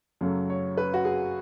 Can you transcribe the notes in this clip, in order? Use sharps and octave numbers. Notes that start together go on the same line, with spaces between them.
F#2 C#3 F#3 A3
C#5
B4
F#4
G#4